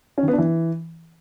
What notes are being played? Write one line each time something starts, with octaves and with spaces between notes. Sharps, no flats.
C#4
D#3
B3
D4
E3